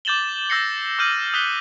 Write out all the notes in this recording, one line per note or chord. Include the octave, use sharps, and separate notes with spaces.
D6 G6 A6 E7 F#7 G7
D6 E6 G6 A#6 C7 C#7
D6 F6 G6 D#7 F#7
D#6 F6 F#6 B6 F#7 G7